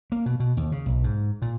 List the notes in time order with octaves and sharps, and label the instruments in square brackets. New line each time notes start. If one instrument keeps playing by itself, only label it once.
[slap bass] A#3
B2
B2
D#2
C#3
B1
G#2
A#2